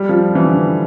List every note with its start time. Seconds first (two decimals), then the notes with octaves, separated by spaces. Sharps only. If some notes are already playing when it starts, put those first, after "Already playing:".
Already playing: G3
0.09 F3
0.35 E3
0.45 D3